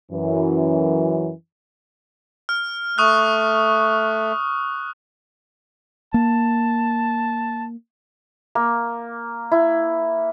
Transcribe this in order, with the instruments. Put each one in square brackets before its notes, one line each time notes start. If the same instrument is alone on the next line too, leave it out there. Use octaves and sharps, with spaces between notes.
[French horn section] F#2 E3
[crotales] F6
[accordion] A3 [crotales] C#6 D#6 F#6
[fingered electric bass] A#3 [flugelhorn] A5
[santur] A#3
E4